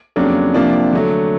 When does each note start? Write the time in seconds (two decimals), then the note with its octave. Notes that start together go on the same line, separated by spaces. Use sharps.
0.16 F2 C#3 F#3 A#3 D4
0.54 C3 F3 A#3 D4
0.93 D3 F#3 A3